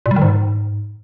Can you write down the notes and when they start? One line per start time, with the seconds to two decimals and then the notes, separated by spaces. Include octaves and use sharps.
0.06 A#2
0.11 G3
0.16 D#3
0.22 G#2